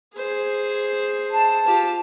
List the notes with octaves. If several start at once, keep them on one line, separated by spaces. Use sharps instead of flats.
G#4 C5
A5
F4 G4